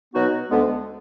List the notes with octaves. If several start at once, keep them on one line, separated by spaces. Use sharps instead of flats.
B2 F#3 B3 D#4 F#4
D2 D3 G#3 B3